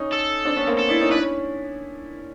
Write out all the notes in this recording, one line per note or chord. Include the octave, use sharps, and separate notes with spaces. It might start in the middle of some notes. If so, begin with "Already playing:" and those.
Already playing: C#4 D#4
A4
C4 D4
B3 C#4
A#3 C4
A4
D4 E4
C#4 D#4
D4 E4 B4
C#4